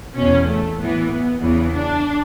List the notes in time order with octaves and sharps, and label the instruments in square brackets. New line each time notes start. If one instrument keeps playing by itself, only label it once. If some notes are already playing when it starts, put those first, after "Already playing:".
[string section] E2 B2 C#4
A3
A2 E3 B3
B3
E2 C#3 E3 B3
D4